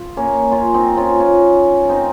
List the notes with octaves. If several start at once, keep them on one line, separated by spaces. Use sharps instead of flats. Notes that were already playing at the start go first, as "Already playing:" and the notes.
Already playing: F4
A#3 C#4
C#4 F4
C4 D#4
C#4 F4
C#4 F4
C4 D#4